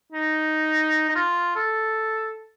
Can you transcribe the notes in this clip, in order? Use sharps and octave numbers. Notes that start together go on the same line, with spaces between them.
D#4
D#4
F4
A4